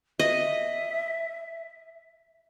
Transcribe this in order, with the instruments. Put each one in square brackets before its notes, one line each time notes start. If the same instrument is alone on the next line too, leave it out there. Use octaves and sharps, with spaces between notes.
[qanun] D#5 [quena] E5